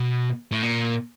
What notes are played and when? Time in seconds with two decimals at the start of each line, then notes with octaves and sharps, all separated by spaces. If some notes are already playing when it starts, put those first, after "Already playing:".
Already playing: B2
0.52 A2
0.62 A#2